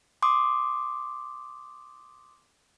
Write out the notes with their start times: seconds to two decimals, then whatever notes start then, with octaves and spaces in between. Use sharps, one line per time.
0.22 C6 D6 D#6